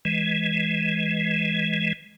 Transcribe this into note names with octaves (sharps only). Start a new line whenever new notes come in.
E3 G#3